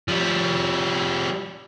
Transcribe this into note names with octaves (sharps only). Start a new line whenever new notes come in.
F3 G3